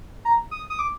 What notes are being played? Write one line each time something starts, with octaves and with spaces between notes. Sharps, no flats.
A#5
D#6
D#6
D6